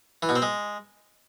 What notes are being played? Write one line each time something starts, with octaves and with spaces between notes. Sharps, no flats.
E3
B2
C4
G#3